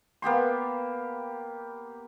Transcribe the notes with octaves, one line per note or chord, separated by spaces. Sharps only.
A#3 B3 G4 C6